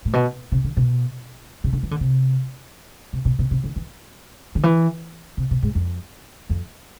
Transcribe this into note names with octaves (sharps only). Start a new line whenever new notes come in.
A2
B2
C3
D3
B2
C3
D3
E3
D3
C3
C3
B2
B2
C3
D3
E3
D3
E3
C3
B2
G#2
F2
F2